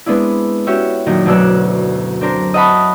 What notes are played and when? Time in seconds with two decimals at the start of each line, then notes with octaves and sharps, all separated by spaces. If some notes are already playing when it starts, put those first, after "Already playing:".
0.06 G#3 B3 C4 D4 E4
0.67 C#4 F#4 G4 C#5 E5
1.06 F#2 A#2 D#3
1.26 D2 B2 F#3 D5 E6 F#6
2.21 C4 D4 A#4 C5
2.54 D#5 E5 F#5 A5 B5 C#6